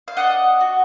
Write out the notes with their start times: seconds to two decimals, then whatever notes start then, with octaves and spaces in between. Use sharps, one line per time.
0.08 F5
0.17 D4 D#5 F#5
0.61 F#4